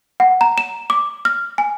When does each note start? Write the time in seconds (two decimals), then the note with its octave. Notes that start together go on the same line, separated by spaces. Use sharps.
0.20 F#5
0.41 A#5
0.58 E7
0.90 D6
1.25 F6
1.58 G#5